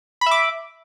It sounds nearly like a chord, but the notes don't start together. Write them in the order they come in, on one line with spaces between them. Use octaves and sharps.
B5 E5 D6